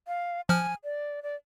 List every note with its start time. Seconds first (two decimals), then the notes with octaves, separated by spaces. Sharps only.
0.08 F5
0.49 F3 G#5 F6
0.84 D5
1.23 D5